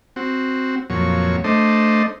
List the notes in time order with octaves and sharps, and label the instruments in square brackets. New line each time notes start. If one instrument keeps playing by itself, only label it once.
[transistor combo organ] C4 F#4
F2 A#2 F#3 C#5
A3 D4 C5 D#5